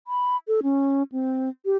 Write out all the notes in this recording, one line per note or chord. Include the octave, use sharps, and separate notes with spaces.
B5
A4
C#4
C4
G4